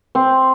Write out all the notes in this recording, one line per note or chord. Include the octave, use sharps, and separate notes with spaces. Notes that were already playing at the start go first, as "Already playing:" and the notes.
C4